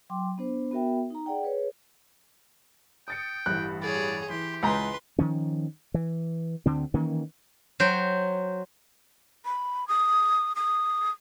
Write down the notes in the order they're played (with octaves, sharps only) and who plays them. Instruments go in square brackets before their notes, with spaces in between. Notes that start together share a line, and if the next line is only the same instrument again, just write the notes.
[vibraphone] F#3 G5 C6 D6
B3 D4 C5
B3 F#4 A#4 E5 G5
D#4 A#5
G#4 D5 F#5 G5
G#4 B4 C#5
[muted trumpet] G5 [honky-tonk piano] D#6 A6 C#7
[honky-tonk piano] A1 G2 E3 [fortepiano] F#6
[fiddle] G#4 C#5 [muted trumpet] D5
[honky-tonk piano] E3 [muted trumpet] G4 [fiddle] C6
[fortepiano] C#2 A#5 [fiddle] B4 C6
[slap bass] D#3 F3 C#4
E3
D2 D3 C4
D#3 E3 A#3 C#4
[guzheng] F#3 C5 G5
[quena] B5
D#6
D#6